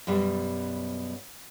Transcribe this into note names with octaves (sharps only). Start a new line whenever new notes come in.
F#2 B2 G3